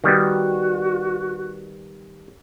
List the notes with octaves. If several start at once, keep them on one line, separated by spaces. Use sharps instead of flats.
D#3 G3 B3 F#4